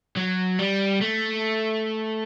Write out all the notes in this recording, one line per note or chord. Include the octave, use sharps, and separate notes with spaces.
F#3
G3
A3